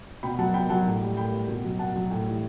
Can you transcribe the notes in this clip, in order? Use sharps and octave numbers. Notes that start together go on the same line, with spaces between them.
B2 G5 B5
F#3 F#5 A5
B2 G5 B5
F#3 F#5 A5
A2
G3
A2 G5 B5
G3
B2
F#3
B2 F#5 A5
F#3
A2
E3 G3